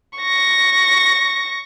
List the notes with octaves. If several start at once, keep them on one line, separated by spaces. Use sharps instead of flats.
C#6 A#6